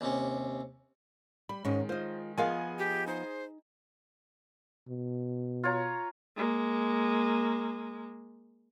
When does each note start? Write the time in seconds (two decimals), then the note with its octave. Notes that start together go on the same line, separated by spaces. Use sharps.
0.01 D#2 C3 C#4
1.49 G3 B5
1.65 G#2 D#3 G#3 C#4
1.89 F4 C5 D#5
2.38 F3 B3 F4 G#4 A#4 D#5 F5 G#5
2.78 G4
3.07 D#4 C5
4.88 B2
5.64 F4 C#5 A#5
6.36 G#3 A#3